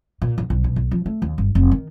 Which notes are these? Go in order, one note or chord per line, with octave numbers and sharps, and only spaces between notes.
A#2
A#1
B1
B2
B1
F3
A3
D#2
G1
F1
D#3